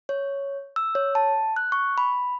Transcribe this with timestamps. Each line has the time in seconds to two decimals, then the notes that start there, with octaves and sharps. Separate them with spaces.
0.09 C#5
0.76 E6
0.95 C#5
1.15 A5
1.56 F#6
1.72 C#6
1.98 B5